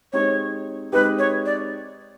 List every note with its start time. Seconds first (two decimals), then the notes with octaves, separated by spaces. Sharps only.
0.13 G#3 C4 D#4 G4 C#5
0.92 G#3 C4 D#4 G4 B4
1.19 C#5
1.46 D5